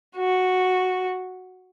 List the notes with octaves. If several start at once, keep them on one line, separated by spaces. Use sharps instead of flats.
F#4